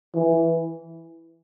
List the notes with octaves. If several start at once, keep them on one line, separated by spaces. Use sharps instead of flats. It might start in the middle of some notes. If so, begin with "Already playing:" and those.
E3